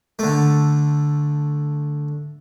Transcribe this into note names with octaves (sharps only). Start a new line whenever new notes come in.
D3 A3